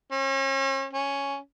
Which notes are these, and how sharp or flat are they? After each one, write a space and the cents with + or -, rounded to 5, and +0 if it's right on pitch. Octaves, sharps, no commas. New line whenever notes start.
C#4 -40
C#4 +5